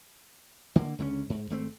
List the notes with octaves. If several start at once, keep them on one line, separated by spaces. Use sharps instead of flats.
D3 A#3
C#2 D3 C4 C#4
G#2
G#1 A3 C4